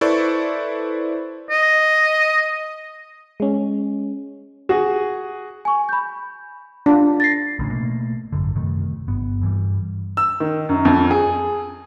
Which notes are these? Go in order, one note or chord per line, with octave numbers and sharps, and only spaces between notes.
E4 A4 B4 C5 D5 C#6
D#5
G#3 C#4
F#4 G#4
G#5 C#6
B5 G6
D4 F4
A6 A#6 C7
A1 A2 C#3
B2 A3 A#3
G#1 F#2 D3
F#2 C3 D#3 A3
G1 B3
G2 E3 G3
E6
D#3
F#2
F2
G#4